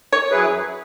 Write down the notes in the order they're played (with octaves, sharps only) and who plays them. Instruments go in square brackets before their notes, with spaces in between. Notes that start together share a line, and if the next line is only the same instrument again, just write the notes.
[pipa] C#5
[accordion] F#2 F#3 E4 G#4 B4